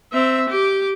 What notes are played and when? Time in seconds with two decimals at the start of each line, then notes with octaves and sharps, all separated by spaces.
0.12 C4 E5
0.49 G4 D6